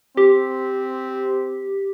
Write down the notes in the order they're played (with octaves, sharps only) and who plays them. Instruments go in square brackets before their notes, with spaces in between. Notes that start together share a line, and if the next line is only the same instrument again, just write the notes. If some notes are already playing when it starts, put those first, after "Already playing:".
[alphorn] C4 [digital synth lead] G4